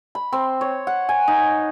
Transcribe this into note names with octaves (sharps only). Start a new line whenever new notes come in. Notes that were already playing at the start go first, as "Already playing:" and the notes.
B5
C4
C#5
F#5
G#5
D#4